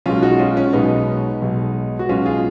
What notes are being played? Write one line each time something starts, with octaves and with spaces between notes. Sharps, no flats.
B1 B2 G#3 C#4 F4
D#4 F#4
C#4 F4
C#4
B1 B2 G#3 B3 D#4
B1 B2 G#3
F#4
B1 B2 G#3 C#4 F4
F4 G#4